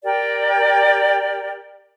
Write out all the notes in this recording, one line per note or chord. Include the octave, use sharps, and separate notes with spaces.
G4 A#4 D5 G5